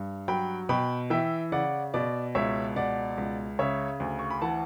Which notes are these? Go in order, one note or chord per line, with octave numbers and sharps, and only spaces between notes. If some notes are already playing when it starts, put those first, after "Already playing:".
Already playing: G2
F#3 G5 B5
B2 G5 B5
E3 E5 G5
C#3 D5 F#5
B2 D5
C#2 C#5 E5
B2 D5 F#5
C#2
C#3 C#5 E5
D2
C#6
B5
E3 F#5 A5